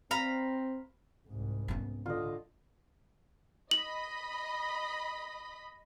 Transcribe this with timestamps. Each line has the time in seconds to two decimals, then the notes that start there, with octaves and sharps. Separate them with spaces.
0.11 C4 F5 A#5 B5
1.28 C2 G#2
1.68 B3 C#4
2.06 D3 F4 D#5
3.71 D#5 B5 F#7